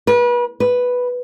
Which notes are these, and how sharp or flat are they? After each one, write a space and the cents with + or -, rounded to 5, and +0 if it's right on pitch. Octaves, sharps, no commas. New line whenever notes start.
B4 -35
B4 +0